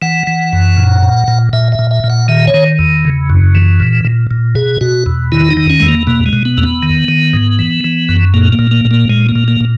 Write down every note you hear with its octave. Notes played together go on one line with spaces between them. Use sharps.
E3 F#5
E3
F#2
A#2
A#2
A#2
A#2 E5
E5
A#2
E5
A#2
F#5
D#3 E5
C#5
D#3
E2
C#3
F#2
E3
A#2
A#2
A#2
B2 G#4
B2 F#4
E2
D#3 E4
D#4
D#3
C#4
E2 G#3
A#3
B2 A#3
G#3
B2
B3
E2 A#3
B3
D#3
D#3
G#2
E3
E3
F#2
A#2 A#3
A#3
A#2
A#3
A#2
A#3
A#2 G#3
A#3
A#2
A#3
A#2